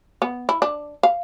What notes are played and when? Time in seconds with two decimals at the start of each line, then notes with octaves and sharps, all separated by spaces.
0.22 B3
0.49 E4
0.62 D4
1.03 F5